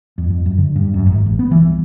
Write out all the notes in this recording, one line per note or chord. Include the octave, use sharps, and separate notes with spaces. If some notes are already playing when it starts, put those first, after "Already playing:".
F2
F2
F#2
D3
G2
F#2
G#1
A1
B3
E3
C2